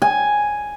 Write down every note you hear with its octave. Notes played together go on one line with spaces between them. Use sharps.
G#5